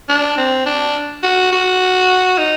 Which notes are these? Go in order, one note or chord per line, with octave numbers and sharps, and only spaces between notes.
D4
C4
D4
F#4
F#4
D#4